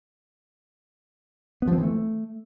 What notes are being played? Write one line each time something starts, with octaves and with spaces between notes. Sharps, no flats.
B3
F3
C4
E3
A3